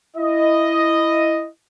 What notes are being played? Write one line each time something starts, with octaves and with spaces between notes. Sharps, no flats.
E4 D#5